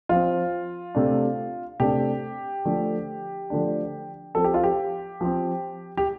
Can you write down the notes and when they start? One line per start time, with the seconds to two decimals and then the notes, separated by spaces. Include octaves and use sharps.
0.09 F3 C4 F4
0.95 C3 A3 D4
1.80 C3 A3 D4 G4
2.65 D3 F3 A3 D4
3.50 D3 F3 A3 D4
4.35 F3 C4 A4
4.44 G4
4.54 F4
4.64 G4
5.21 F3 C4
5.97 G4